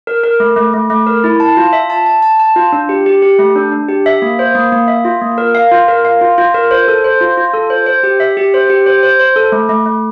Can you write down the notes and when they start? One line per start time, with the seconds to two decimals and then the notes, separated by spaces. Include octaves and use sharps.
0.07 A#4
0.24 A#4
0.40 A3
0.56 A3
0.73 A3
0.90 A3
1.07 A#4
1.24 E4
1.40 A5
1.57 F4
1.73 E5
1.90 A5
2.06 A5
2.22 A5
2.40 A5
2.56 F4
2.72 D4
2.89 G4
3.06 G4
3.22 G4
3.39 A3
3.56 D4
3.72 D4
3.89 G4
4.06 E5
4.22 A#3
4.39 C5
4.55 A#3
4.72 A#3
4.88 E5
5.05 F4
5.21 A#3
5.38 A#4
5.55 F5
5.71 F4
5.88 A#4
6.05 F5
6.21 F4
6.38 F4
6.54 A#4
6.71 C5
6.88 A4
7.04 C5
7.21 F4
7.37 F4
7.54 A4
7.70 C5
7.86 C5
8.03 G4
8.20 E5
8.37 G4
8.54 C5
8.70 G4
8.86 C5
9.03 C5
9.19 C5
9.36 A4
9.52 A3
9.69 A3
9.86 A3